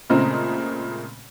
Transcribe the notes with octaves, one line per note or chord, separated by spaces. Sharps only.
A#2 C#3 G#3 A3 C4 A#5